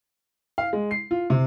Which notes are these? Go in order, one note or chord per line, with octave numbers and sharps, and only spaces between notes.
F5
G#3
C7
F4
C3